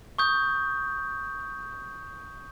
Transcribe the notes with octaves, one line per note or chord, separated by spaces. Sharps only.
C#6 D#6 G6